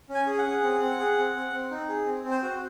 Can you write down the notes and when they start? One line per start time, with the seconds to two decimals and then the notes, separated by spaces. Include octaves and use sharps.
0.09 C#4
0.15 G#5
0.27 G#4
0.38 F#5
0.44 G#4
0.63 C4
0.80 C4
0.99 G#4
1.17 C4
1.35 C4
1.52 C4
1.71 D#4
1.88 G#4
2.06 C4
2.24 C4
2.31 C5
2.43 F#4